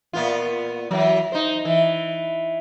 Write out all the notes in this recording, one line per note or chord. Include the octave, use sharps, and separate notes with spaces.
A#2 B3 F4
E3 F#3
D#4 C5
E3